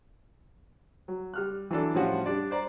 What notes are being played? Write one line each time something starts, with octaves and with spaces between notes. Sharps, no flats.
F#3
G3 F6 F#6
E3 F#3 D4 A4
A2 F3 G3 C#4 F4 F#4
G3 D4 D5
C5 D5 A#5